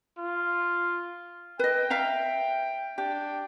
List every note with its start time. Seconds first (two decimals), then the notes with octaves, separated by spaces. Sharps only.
0.18 F4
1.59 B4 D#5 G5
1.90 E5 F5 A#5
2.98 D4 G4 G5